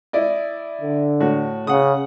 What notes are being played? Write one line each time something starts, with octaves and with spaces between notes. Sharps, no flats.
E4 D5 D#5
D3
A2 F#4
C#3 F#5 D#6